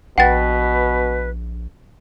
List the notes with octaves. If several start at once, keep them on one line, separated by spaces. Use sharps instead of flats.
A#1 B2 B4 F#5 G5 A6